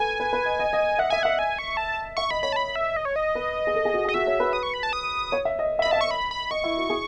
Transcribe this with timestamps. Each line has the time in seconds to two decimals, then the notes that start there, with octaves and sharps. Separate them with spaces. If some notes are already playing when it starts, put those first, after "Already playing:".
Already playing: A4 B4 G#5
0.20 B4
0.33 B4
0.46 D#5
0.59 D#5
0.73 D#5
0.99 E5 F#5
1.10 E5 G#5
1.23 E5 F#5
1.39 G#5
1.58 C#6
1.77 A5
2.17 E5 C#6
2.31 D#5 B5
2.43 C#5 B5
2.52 A5
2.56 B5
2.76 E5
2.96 D#5
3.05 C#5
3.16 D#5
3.35 B4
3.67 G#4
3.75 A4
3.85 G#4
3.94 F#4
4.05 G#4
4.09 D#5
4.14 F#4 E5
4.27 C#5
4.40 B4
4.53 D#6
4.63 C#6
4.74 B5
4.83 A5
4.93 D#6
5.32 C#5
5.45 E5
5.59 D#5
5.79 E5
5.82 D#5 B5
5.91 E5 A5
6.01 C#6
6.11 B5
6.31 B5
6.51 D#5 C#6
6.64 E4
6.77 F#4
6.89 G#4